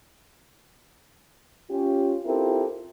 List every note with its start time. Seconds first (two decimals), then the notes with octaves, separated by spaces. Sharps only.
1.71 C#4 F4 G4
2.25 C4 E4 F4 G4 A4 A#4